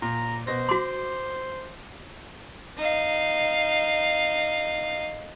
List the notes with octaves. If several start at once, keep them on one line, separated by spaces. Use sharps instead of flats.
A#2 A#5
B2 C5 A#6
F#4 C6 D6
D#4 F5